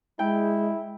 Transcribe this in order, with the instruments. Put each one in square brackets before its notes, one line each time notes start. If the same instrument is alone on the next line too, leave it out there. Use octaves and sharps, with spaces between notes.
[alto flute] G#3 [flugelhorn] E4 [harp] G5